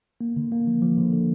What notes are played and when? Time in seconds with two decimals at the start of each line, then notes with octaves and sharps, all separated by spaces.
0.21 A#3
0.36 D3
0.52 A#3
0.67 F3
0.82 F3
0.97 D3
1.13 D3